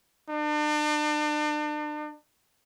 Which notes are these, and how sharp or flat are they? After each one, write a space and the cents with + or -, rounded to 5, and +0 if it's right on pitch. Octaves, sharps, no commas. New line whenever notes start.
D4 +40